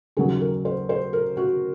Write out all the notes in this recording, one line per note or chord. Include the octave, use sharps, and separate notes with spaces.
D#2 C#3 F#3 G#4
A#4
C5
C5
A#4
F#4